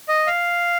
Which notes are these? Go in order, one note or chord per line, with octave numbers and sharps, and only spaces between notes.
D#5
F5